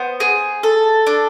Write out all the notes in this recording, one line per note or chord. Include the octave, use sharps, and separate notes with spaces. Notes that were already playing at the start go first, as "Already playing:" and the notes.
Already playing: B3 C5
G#4
A4
D4